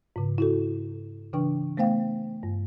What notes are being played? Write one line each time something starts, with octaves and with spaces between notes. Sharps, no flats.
G#2 C#3
E4 F#4 A4
C#3 E3 D4 G5 C#6
A3 B3 C5 F5 G5
G2